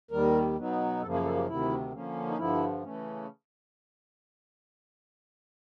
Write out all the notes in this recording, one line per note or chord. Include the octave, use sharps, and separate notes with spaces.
D#2 D#3 G3 A#4
B2 F#3 B3 D#4
F#2 C#3 F3 A#3 A4
G#4
A4
G4
D2 C3 D#3 E4
D3 F3 A#3 C#4
D#4
G2 D3 F3 E4
C#3 E3 A3 C#4